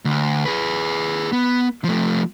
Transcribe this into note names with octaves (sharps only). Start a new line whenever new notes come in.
D2
G#4 B4
B3
F3 A3